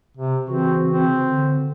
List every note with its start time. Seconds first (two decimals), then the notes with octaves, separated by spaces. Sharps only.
0.17 C3
0.49 C#3 E3 C4 F#4
0.91 C4
1.26 D3